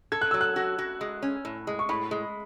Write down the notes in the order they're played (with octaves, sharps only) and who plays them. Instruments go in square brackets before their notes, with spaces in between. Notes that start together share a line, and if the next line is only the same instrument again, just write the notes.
[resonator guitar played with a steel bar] A4 [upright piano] G#6
[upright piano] F#6
[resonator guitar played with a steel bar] F#3 [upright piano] E6
[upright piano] F#6
[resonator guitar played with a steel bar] F#4
F#4
G#3
C#4
A2
G#3
[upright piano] C#6
[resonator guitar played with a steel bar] A2 [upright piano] B5
[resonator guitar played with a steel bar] G#3